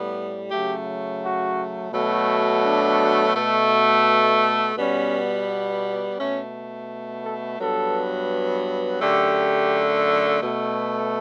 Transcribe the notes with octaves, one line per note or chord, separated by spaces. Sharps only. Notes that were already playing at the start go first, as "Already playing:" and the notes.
Already playing: A2 G3 B3
C#3 F#3 A3 G4
F#4
B2 F#3 A3
D4
B2 A3
B2 G3 B3 C#4
B2 A3 C#4
A4
G2 F#3 B3 A4
F#2 D3 A3 G4
B2 A3